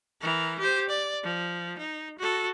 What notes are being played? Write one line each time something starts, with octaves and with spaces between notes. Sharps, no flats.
E3 A#4
G4 C5
D5
F3
D#4
F#4 A4